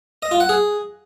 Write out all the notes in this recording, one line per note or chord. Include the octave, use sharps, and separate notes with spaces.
D#5
F4
F#5
G#4